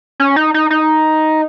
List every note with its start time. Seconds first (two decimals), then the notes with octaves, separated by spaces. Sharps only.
0.20 C#4
0.36 D#4
0.54 D#4
0.70 D#4